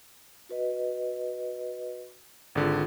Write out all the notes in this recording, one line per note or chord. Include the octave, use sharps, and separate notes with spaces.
F#4 B4 D#5
G#1 D3 F4 G#4